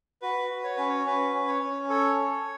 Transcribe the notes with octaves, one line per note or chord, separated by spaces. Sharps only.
F#4 B4
F#4
C#5
C#4 B4
C#5
C#4 B4
C#4
C#5
C#4
A4 C#5
A4